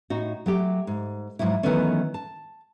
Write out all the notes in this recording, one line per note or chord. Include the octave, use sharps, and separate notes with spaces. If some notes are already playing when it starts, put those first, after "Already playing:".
A2 D#4 F#4
F#3 A3 G4
G#2
G#2 B2 F3 F#3 E4
D#3 E3 F#3 A3 B3 C#4
A5